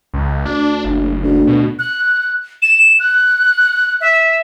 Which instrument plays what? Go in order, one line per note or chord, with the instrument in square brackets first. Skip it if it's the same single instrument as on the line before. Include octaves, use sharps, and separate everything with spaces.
[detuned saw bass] C#2
[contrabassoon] D2 [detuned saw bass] D4
[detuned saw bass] F#1
[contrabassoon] D2
[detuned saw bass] B2
[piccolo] F#6
E7
F#6
E5